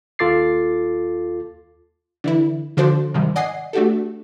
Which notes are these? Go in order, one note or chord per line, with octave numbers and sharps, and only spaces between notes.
D#2 F4 A4 D6 A6 C7
D3 E3 E4
D3 F3 D4 F#4 A4 C5
G#2 C3 D#3 F3 G3
D5 D#5 F#5 G#5 D#6 C7
A3 D4 F#4 G4 A4